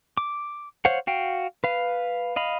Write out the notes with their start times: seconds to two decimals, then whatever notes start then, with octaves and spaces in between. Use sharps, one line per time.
0.17 D6
0.85 C5 C#5 F5 F#5
1.07 F#4 F5 G5
1.64 B4 F5
2.36 D#5 F5 B5